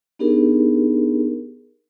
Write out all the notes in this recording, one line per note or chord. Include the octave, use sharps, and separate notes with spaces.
B3 D4 D#4 G4 G#4 A#4